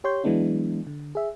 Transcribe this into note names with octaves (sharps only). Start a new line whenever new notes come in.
G4 C#5 C6 G6
E3 F#3 G#3 B3 D4 E4
D3
G#4 E5